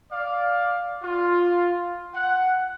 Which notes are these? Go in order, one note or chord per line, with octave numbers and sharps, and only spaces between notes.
D5 F5
F4
F#5